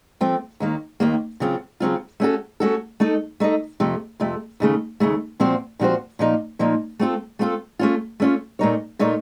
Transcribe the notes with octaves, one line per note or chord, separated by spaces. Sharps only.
F3 A3 C4
D#2 D#3 A#3
D#2 D#3 A#3
C#3 F#3 C4 F4
C#3 F#3 C4 F4
A3 C#4 F#4 A4
A3 C#4 F#4 A4
A3 D#4 A4 D#5
A3 D#4 A4 D#5
F2 C3 F3 A3
F2 C3 F3 A3
D#2 C#3 A3
D#2 C#3 A3
A#2 F3 C4 F#4 C5
A#2 F3 C4 F#4 C5
A#2 F3 A#3 D#4
A#2 F3 A#3 D#4
A3 C4 F4 A4
A3 C4 F4 A4
A3 C#4 F4
A3 C#4 F4
A#2 A3 D#4 A#4 C#5
A#2 A3 D#4 A#4 C#5